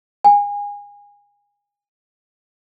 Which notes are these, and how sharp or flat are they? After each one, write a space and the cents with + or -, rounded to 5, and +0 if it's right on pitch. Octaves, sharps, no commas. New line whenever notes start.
G#5 -25